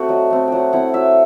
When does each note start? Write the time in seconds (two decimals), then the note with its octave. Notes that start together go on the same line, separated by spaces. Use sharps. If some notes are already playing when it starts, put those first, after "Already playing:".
Already playing: A3 C4 F#4
0.09 F#3 D#5
0.30 A3 C4
0.48 F#3 F#5 G5
0.73 C4 E4 F#5
0.94 F#3 E5